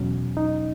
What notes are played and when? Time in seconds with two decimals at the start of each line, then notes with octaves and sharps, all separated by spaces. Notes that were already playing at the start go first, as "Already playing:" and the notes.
Already playing: E2 B2 F#3 C#4
0.37 D#4